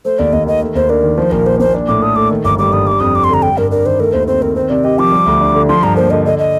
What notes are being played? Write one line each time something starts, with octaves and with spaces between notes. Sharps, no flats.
A3 C5
D#2 D5
D#2 D#5
D#3 D#5
A3
D#2 C5
D4 A#4
D#3
F3 C5
A#1 A#4
A#3 C5
A#2 C5
D4
A2 D6
A4 D#6
A3 D6
D#3
G1 D6
G3 D6
G2 D#6
G3 D6
F2 D#6
C4 D6
C6
D3 A#5
G3 G5
G2 A#4
D4 A#4
D#3 C5
A3 A#4
D#2 C5
C4 C5
D#3 A#4
C4 C5
C3 D5
G4 D#5
F3 D6
G3
D2
D4
D3
F3 C6
G2 A#5
A#3 C5
D3 D#5
D3 D#5
D#5